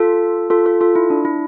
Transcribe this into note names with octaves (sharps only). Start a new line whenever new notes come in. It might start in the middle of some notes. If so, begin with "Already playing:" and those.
Already playing: F4 A4
F4 A4
F4 A4
F4 A4
E4
D4
E4